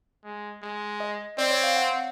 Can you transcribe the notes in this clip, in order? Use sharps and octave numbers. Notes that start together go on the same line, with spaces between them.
G#3
G#3
D#5
C4 D5
C#5
F5
F#5